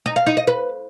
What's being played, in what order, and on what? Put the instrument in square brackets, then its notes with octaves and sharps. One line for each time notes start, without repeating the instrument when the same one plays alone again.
[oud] D#4
F5
D#4
D#5
B4